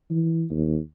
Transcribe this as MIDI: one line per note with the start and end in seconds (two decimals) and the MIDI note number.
0.11 0.45 52
0.50 0.78 39